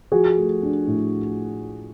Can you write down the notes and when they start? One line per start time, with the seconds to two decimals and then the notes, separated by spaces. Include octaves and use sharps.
0.12 F3 F#4 G#4
0.37 A3
0.63 D4
0.87 A2